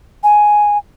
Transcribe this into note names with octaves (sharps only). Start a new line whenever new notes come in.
G#5